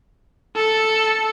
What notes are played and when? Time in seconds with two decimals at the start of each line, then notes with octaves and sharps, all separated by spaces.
0.56 A4 C#7